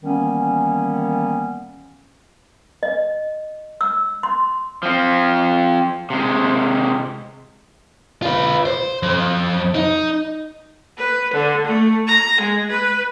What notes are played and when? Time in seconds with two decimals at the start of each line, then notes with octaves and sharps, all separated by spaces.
0.03 D#3 E3 G3 A#3 B3 C#4
2.83 D#5
3.81 E6
4.23 C6
4.83 F3 C4
6.10 C3 G#3
8.23 F4 B4
8.65 C5
9.03 F2
9.75 D#4
10.98 B4
11.33 D3
11.67 A3
12.08 A#5
12.40 G#3
12.71 B4